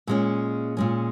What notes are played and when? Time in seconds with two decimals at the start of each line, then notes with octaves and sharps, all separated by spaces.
0.07 A#2 G#3 C#4
0.77 A#2 G#3 C#4